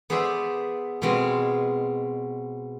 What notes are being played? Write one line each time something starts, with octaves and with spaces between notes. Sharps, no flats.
B3 G#4 B4 C5 D5 E5
B2 G#3 B3 C4 F4 G#4